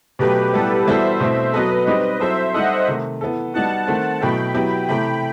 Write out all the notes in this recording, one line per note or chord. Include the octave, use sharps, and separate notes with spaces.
B2 F#3 A3 G4 B4
A2 G3 B3 A4
E3 G3 B3 F#4 A4 C5 E5
B2 A3 C4 E4
F#3 B3 F#4 A4 B4 D#5
G3 C4 D#4 G4
F#3 C4 E4 A4 C5 E5
G3 D#4 A4 D#5 F#5
C3 D#3 A3
E3 B3 E4 A4
G3 B3 D#4 F#4 F#5 A5
D#3 A3 C4
B2 F#3 A3 E4 A4 G5 B5
F#3 B3 E4 G4
C3 E3 A3 G5 B5